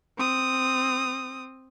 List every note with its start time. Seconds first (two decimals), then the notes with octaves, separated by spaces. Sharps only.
0.18 C4 D#6